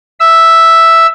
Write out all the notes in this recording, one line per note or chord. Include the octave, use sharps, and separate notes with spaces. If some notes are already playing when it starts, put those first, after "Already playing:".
E5 E6